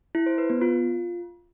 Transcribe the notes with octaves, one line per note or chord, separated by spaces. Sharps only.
E4
C5
B4
B3
F4